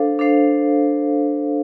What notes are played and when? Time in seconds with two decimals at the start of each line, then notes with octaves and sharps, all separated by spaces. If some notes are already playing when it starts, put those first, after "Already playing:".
Already playing: D4 A4 C5 F5
0.19 D4 A4 C5 F5